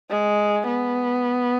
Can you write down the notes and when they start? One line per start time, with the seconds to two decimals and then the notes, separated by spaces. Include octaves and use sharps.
0.10 G#3
0.67 B3